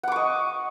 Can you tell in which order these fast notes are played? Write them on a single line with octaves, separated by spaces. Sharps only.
F#5 D6 C#6 D#5